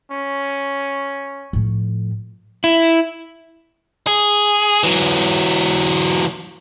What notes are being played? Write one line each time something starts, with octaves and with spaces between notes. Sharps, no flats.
C#4
A2 F3
E4
G#4
E3 F#3